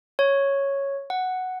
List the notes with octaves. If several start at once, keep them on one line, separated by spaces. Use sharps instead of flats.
C#5
F#5